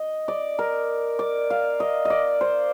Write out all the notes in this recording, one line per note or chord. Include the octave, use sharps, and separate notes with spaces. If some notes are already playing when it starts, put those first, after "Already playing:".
Already playing: D#5
D5
A#4
D5
F5
D#5
D5 D#5
C5